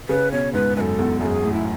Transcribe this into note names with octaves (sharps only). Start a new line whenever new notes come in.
C#3 B4
B2 C#5
G#2 B4
F#2 B4
A4
E2
F#2 A4
G#4
A2
E4